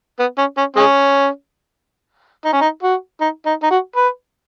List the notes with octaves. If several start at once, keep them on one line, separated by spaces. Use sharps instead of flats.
B3
C#4
C#4
G#3 C#4
D#4
C#4
D#4
F#4
D#4
D#4
D#4
F#4
B4